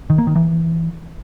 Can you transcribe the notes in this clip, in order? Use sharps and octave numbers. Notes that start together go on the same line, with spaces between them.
D#3
A#3
D#3
E3